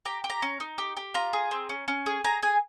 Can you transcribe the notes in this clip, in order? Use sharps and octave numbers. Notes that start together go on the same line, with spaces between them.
G4 A#5
G4
A#5
C#4
D#4
G4
G4
F4 A#5
G#4
C4
C#4
C#4
G#4
G#4 A#5
G#4 G#5